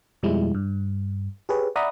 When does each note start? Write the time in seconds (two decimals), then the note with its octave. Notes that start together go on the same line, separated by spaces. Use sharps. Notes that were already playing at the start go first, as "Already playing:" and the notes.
0.23 F2 B2 F3 G3 G#3 E4
0.55 G2
1.49 G4 G#4 B4 C#5
1.76 D5 E5 F#5 A#5 B5 D#6